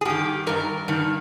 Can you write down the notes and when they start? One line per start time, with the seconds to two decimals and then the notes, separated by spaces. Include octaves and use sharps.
0.01 G#4
0.05 G2 D#3 G4
0.47 G2 D#3 A#4
0.88 G2 D#3